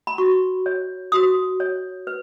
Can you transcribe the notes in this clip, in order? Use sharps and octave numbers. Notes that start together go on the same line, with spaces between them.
B5
F#4 C#6
C#5
F#4 D#6
C#5
B4